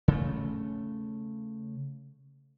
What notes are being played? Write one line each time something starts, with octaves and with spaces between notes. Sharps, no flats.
C#3 A3